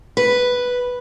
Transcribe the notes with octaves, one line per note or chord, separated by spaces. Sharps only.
B4